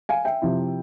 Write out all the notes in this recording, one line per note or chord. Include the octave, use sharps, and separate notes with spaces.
F5 G#5
E5 G5
C3 F3 C4 E4